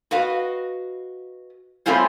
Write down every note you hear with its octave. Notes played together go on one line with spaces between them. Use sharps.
F#4 B4 D#5 F5
G3 A3 C4 C#4 F4 C5